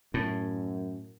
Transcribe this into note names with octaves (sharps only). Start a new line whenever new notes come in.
F#2 A2